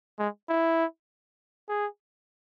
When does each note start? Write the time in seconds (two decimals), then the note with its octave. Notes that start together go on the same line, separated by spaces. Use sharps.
0.19 G#3
0.49 E4
1.69 G#4